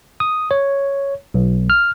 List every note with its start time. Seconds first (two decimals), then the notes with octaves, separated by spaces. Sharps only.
0.20 D#6
0.51 C#5
1.34 B1
1.70 F6